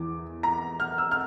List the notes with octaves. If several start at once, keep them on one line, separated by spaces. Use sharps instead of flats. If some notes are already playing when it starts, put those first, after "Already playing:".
Already playing: E2 E3 D6
A#5
F6
E6
F6